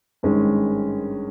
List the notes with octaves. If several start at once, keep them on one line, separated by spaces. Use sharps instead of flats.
G#1 G2 D#3 G#3 C#4